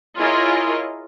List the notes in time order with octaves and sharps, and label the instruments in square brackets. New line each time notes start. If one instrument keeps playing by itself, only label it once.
[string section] E4 F4 G#4 A#4 C#5 D#5